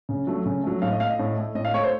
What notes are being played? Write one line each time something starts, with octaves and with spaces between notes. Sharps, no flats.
C#3
F#3 A3
C#3
F#3 A3
A2 F5
D#5
A3 F5
D#5
A2
A3
A2 D#5
F5
A3 C#5
C5